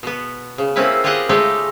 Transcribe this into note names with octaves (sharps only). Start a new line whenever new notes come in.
B2 B3
C#3
A3 A#3 C4 C#4 E4 B4
F4 G4 G#4 D#5 F#5
C#3 G#3 A3 D#4 G4